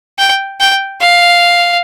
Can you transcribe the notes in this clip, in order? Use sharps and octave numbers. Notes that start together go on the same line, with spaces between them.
G5
G5
F5